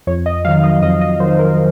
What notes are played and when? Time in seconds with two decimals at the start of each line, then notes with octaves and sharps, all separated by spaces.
0.07 F2 C#5
0.26 D#5
0.45 D#3 F#3 F5
0.64 D#5
0.82 F2 D#5
1.01 D#5
1.20 D#3 F#3 C5
1.39 A#4